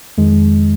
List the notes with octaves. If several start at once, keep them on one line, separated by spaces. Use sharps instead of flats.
F2 D#3 G#3